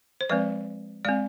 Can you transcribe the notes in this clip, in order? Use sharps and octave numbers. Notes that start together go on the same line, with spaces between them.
C5
F3 G#3 C4 B4 D5
G#3 C4 D5 F5